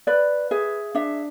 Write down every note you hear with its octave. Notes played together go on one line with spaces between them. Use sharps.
B4 D5
G#4 E5
D4 E5